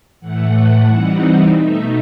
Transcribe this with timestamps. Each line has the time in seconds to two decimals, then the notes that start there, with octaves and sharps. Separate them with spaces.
0.20 A2 E3 A3 F#5
0.86 E3 G3 C4 D#4
1.53 B2 A3 D#4 E5